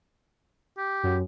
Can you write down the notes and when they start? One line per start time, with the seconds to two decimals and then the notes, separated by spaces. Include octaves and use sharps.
0.78 G4
1.03 F#2